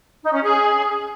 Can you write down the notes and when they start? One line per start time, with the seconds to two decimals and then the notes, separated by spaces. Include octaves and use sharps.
0.23 D#4
0.33 C#4
0.43 G#4